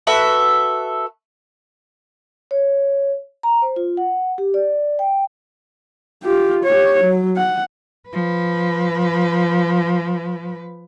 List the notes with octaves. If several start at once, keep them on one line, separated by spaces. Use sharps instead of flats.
F#4 A4 B4 E5
C#5
A#5
C5
F4
F#5
G4
D5
G5
F4 G4
G4 C#5
F#3
F#5
F3 B4